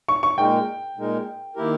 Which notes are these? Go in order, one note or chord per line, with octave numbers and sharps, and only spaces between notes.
C#6
C#6
A#2 G#3 D#4 A#4 G5
A#2 G#3 D#4 A#4
D#3 A#3 E4 G4 A#4